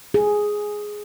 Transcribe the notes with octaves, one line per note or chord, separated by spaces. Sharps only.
G#4